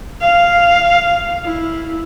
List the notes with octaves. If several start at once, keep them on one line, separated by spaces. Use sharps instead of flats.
F5
E4